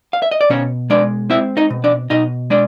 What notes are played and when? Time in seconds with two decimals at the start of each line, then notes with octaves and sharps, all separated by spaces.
0.13 F5
0.22 E5
0.31 D#5
0.41 D5
0.50 B2 C#4 C#5
0.90 G#3 D4 D5
1.30 C4 E4 E5
1.57 D#4 D#5
1.70 B2
1.84 D4 D5
2.10 B2 D#4 D#5
2.50 G#3 D4 D5